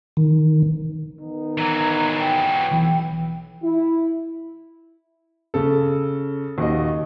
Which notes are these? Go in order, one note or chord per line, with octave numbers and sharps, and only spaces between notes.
D#3
D#3 B3 D#4
E3 F#3 A#5
G5
B1 E3
E4
C#3 A4
D#2 F#4 D#5